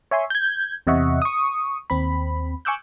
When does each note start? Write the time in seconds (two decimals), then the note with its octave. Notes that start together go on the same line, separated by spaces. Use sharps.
0.11 C#5 E5 G#5 C6
0.30 G6 G#6
0.87 E2 C3 D#5 E5 F#5 C#6
1.22 C#6 D#6
1.90 D#2 C4 B5
2.65 G#5 C#6 D6 E6 F#6 G6